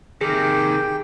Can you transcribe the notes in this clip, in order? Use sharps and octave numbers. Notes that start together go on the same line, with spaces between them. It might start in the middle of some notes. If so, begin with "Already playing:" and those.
C3 D#3 G4 G#4 G5